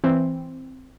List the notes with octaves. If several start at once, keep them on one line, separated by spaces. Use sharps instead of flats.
E3 C4